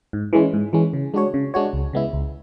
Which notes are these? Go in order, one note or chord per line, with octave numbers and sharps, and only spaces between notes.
G#2
E3 G#3 C#4
G#2
E3 G#3 C#4
C#3
G#3 D4 F#4 C#5
C#3
G#3 D4 F#4 C#5
C#2
C#3 G#3 B3 E4
C#2